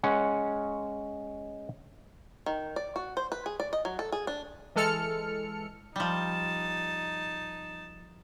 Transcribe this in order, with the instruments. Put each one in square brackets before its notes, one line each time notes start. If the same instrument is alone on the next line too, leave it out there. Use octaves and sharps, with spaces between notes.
[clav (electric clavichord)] G#3 C#4 F#5
[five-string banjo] D#3
D5
F#4
C5
B4
G#4
D5
D#5
F#3
A4
G#4
D4
[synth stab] E3 G#3 A4 F6 C#7
[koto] F3 G3 [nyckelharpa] D#4 A5